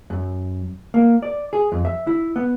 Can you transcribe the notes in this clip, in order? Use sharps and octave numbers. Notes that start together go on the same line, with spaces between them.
F#2
A#3
D5
G#4
F2
E5
E4
B3